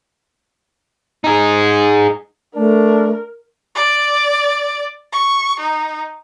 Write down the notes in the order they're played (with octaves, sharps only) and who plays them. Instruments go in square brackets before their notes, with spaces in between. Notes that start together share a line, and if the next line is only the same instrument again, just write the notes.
[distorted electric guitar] D#4 G#4
[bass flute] A3 [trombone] D4 [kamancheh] A#4
[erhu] D5
C#6
D#4